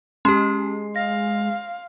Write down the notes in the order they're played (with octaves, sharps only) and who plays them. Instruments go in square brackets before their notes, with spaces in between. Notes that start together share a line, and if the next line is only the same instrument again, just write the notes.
[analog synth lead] G#3 [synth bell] C#4 G4 [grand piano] C6
[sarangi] F5 [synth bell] A#6